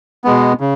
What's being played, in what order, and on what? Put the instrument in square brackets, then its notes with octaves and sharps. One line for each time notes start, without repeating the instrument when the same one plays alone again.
[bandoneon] B2 G#3 B3
C#3